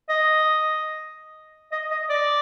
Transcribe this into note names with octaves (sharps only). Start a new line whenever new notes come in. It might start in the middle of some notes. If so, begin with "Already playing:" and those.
D#5
D#5
D#5
D5